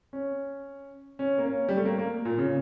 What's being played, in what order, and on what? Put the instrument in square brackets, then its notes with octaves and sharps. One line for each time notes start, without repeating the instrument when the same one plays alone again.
[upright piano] C#4
C#4
A#3
C#4
G3
A3
A#3
A#3
A#2
C#3